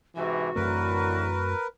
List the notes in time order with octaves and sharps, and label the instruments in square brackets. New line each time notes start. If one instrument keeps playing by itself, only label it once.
[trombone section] G#2 C3 E3 [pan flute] F#4
[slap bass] F#2 A3 C4 [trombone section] A2 D3 E3 [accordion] A#4 B4